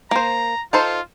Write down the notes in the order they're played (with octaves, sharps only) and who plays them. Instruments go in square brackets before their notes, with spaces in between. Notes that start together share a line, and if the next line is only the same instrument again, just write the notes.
[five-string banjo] A#3 C5 [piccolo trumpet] A#5
[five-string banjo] D#4 A4 C5 [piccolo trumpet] F4